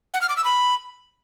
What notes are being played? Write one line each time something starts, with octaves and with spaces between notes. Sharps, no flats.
F#5
F6
D6
E6
B5